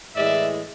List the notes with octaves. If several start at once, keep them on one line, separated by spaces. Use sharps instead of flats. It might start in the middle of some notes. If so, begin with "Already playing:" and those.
A2 E3 G#3 D5 E5